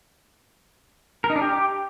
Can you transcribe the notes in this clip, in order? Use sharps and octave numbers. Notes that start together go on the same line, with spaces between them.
A#4
D#4
D4
G4